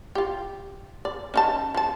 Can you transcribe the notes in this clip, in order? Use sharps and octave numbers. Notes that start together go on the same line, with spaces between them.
F4 G4
D5
C#4 D#4 A5
F3 A5